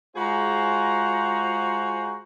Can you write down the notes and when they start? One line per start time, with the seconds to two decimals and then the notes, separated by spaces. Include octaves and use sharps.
0.16 G#3 F4 F#4 G#4 C5 A#5